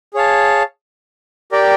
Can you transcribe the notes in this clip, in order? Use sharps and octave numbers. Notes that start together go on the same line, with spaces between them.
G#4 C#5 F5 A5
G4 A#4 D5 G5